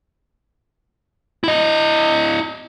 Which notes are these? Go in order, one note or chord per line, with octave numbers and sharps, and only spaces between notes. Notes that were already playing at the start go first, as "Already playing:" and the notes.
E4 D#5